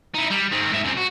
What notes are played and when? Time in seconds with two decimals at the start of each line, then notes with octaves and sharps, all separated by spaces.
0.14 D#4 E4
0.30 G3
0.51 D#3 C4
0.72 G#2 E5
0.84 F#2 C4
0.97 F#4